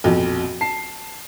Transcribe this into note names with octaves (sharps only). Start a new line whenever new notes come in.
A#1 F2 B2
A5 C7